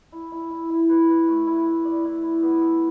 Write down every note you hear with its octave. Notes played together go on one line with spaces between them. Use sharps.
E4
E4
E4
E4
B4
B4
A3
E4
E4
D5
E4
E4
B3
A4